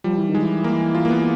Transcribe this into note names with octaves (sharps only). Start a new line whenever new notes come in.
F3 G3
E3
D#3 G#3
E3
A#3
F4
A#3
B3